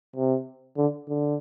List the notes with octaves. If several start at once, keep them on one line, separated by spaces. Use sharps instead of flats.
C3
D3
D3